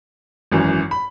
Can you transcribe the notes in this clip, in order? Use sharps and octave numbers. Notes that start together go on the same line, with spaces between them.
G#1 F#2 E3
B5